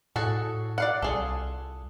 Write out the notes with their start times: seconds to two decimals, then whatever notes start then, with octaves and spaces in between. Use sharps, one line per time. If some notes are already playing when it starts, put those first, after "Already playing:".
0.16 A2 F#4 G#4 A4
0.78 D5 F5 F#5
1.02 C2 F4 G#4 A4